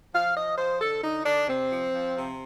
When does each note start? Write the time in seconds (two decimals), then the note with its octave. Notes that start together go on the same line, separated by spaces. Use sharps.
0.13 F3 F5
0.35 F3 D#5
0.58 F3 C5
0.81 D3 A4
1.04 D3 D#4
1.25 D3 D4
1.48 C3 C4
1.70 F3
1.93 F3
2.17 C3